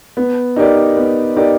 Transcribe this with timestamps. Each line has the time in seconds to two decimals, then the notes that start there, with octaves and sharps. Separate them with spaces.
0.17 B3
0.56 D#4 G4 A#4 D5
0.97 B3
1.36 D#4 G4 A#4 D5